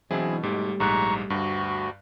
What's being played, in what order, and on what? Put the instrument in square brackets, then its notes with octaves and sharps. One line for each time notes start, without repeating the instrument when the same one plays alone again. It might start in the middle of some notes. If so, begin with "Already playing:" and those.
[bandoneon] B2 [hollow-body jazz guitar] E3 F#3 D4 [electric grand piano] C4 E4 G#4
[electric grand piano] G#2 [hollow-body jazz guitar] G3 A3 G4
[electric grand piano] A#1 G#2 F#6 [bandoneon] A#5 C#6
[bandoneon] D2 F#4 [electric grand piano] G2